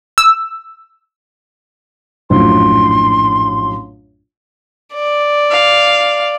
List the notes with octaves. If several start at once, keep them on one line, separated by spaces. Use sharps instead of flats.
E6
A#1 F#2 A2 C6
D5
F5